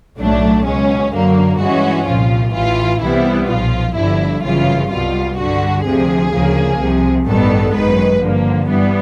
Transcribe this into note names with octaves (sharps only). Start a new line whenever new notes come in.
B1 A2 F#3 A3 D4
C#2 B2 G#3 C#4
F#2 D3 F#3 A#3
G2 E3 G#3 C#4 F#4
C2 A#2 F3 F4
A1 A2 E3 F4
C2 C3 E3 G3 B3 E4
B1 A#2 F3 F4
G1 G2 D3 F3 E4
G1 F#2 C#3 E3 F4
C2 B2 G3 F4
G2 D3 G3 F#4
D2 C3 F3 G#4
D2 C#3 F3 A#3
C2 C3 F3
A1 G2 D#3 G3 B3 A4
G#1 F#2 D#3 G#3 B4
G2 D3 F3 A#3
G2 E3 G3 B3